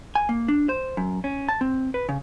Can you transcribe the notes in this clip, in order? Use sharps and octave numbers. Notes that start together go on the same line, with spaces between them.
G#5
A#3
D4
C5
F#2
C#4
A5
C4
B4
C#3